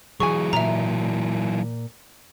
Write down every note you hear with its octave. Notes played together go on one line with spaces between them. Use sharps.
E3 F#3 G#4 G#5 C#6
A#2 E5 A#5